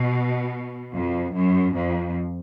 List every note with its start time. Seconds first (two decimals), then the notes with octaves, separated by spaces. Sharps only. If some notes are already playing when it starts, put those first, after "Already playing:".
Already playing: B2
0.94 F2
1.34 F#2
1.75 F2